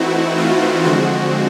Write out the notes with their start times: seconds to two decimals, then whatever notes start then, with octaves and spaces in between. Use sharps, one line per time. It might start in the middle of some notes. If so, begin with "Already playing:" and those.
Already playing: E3 A3 C4 D#4 E4 F#4
0.38 F4
0.84 D3 F3 G#3 C4 F#4